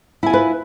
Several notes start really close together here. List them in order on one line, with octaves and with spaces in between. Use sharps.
E4 G#5 F4 B4